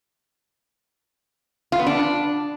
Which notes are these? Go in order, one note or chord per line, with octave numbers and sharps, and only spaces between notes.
F4
B3
D4